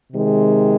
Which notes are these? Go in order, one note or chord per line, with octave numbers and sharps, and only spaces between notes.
C3 D#3 G#3